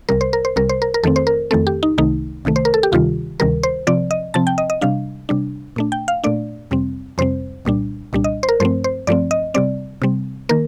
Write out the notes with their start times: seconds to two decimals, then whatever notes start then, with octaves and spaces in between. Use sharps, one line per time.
0.09 C2 C3 G3 A#4
0.21 C5
0.33 A#4
0.45 C5
0.56 C2 C3 G3 A#4
0.69 C5
0.82 A#4
0.94 A#4
1.03 F2 D#3 A3 C4 A4
1.16 C5
1.27 A#4
1.51 F2 D#3 A3 C4 A4
1.67 G4
1.83 D#4
1.98 C2 C3 D#3 A3 D#4
2.45 C2 C3 D#3 A3
2.56 C5
2.65 A#4
2.74 A4
2.83 G4
2.92 D2 C3 D#3 G3 F4
3.40 D2 C3 D#3 G3 A#4
3.63 C5
3.87 C3 F3 C4 D5
4.11 D#5
4.34 C3 F3 C4 A5
4.47 G5
4.58 D#5
4.70 D#5
4.81 C3 G3 D4 F5
5.29 C3 G3 D4
5.76 A#2 A3 D4
5.92 G5
6.08 F5
6.24 A#2 A3 D4 D5
6.71 F2 C3 G3 C4
7.18 F2 C3 G3 C4 C5
7.65 C2 A#2 G3 D4
8.13 C2 A#2 G3 D4
8.24 D#5
8.43 C5
8.49 A#4
8.60 G2 F3 A3 C4 C5
8.84 C5
9.07 G2 F3 A3 C4 D5
9.31 D#5
9.54 C3 G3 C4 D5
10.02 C3 G3 C4
10.49 D#3 A#3 A#4